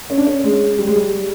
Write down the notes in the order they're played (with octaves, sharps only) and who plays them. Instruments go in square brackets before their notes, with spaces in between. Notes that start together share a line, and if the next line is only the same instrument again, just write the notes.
[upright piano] C#4
D4
C#4
G#3
G3
G#3
G3